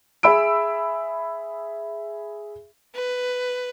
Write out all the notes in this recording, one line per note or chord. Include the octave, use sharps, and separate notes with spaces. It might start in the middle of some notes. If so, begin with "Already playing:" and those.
G#4 E5 B5 E6 D7
B4